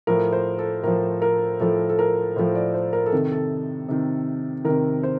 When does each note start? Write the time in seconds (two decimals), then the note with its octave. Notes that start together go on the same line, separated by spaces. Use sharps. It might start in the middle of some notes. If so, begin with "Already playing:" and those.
0.07 A2 F3 A#4
0.33 C5
0.59 A4
0.83 A2 F3 A#4
1.22 A#4
1.60 A2 F3 A4
1.89 A4
1.99 A#4
2.36 A2 F3 C5
2.55 D5
2.74 C5
2.93 A#4
3.06 A4
3.12 C3 D#3
3.31 A4
3.88 C3 D#3
4.65 C3 D#3 A#4
5.03 C5